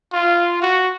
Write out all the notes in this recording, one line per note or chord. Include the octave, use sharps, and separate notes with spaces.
F4
F#4